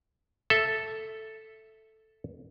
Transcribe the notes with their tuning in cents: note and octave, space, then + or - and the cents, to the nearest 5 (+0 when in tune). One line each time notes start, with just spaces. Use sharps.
A4 +0 E5 +0